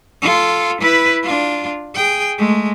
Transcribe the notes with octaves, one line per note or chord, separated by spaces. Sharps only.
F4 A4
E4 B4
D4 F4
G#4 G5
G#3 A3